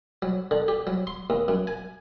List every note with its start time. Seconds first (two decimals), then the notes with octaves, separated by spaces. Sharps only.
0.22 F#3
0.51 D3
0.68 G4
0.87 F#3
1.07 C6
1.30 D#2
1.48 F#2
1.67 G#5